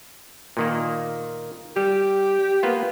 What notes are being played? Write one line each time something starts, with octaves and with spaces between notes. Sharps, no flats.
A#2 D#3 A#3
G3 G4
A#3 B3 F4